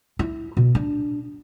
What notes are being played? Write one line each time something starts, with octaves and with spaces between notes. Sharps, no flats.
E4
B2
D4